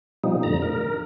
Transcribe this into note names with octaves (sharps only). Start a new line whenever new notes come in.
B2 F3 G3 D#4
F2 A2 D3 A#5
A#4